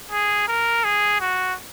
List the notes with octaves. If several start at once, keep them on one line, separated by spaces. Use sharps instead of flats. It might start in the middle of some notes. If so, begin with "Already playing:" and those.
G#4
A#4
G#4
F#4